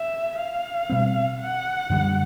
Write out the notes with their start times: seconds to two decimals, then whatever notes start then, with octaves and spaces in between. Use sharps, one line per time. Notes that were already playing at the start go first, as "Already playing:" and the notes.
Already playing: E5
0.39 F5
0.90 B2 G3 C4
1.40 F#5
1.90 F#2 D3 G3